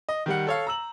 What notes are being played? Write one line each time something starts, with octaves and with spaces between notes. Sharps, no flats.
D#5
D#3 G3 F#5
A4 C#5 F5
A#5 E6 F#7